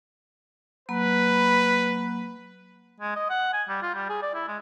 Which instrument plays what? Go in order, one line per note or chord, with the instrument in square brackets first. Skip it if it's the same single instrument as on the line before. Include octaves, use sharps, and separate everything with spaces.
[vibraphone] F#3 A#3 B5 [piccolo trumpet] B4
[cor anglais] G#3
D#5
F#5
G#5
G3
F4
G3
G#4
D5
E4
G#3